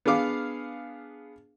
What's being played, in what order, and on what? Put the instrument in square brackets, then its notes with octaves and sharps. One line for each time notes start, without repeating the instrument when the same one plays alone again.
[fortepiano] B3 D4 G#4 F5 D6